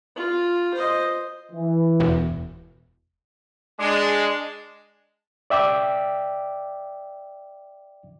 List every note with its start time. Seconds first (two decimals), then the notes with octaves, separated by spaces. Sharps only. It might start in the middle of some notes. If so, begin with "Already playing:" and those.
0.16 F4
0.74 C5 D#5
1.52 E3
2.00 E1
3.79 G#3 D4
5.50 D5 E5 G5 D6